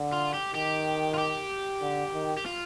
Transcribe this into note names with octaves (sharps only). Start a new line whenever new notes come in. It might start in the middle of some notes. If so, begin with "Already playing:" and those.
Already playing: D3
F4
G4
D#3 G4
F4
G4
D3
D#3
G4
F4